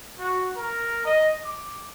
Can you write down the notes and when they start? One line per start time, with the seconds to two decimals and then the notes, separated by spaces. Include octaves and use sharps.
0.19 F#4
0.56 A#4
1.05 D#5
1.45 D6